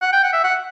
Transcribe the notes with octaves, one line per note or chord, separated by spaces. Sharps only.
F#5
G5
F#5
E5
F#5